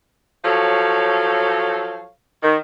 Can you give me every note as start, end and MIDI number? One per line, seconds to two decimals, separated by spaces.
0.44 2.06 53
0.44 2.06 54
0.44 2.06 69
0.44 2.06 73
0.44 2.06 77
2.42 2.56 51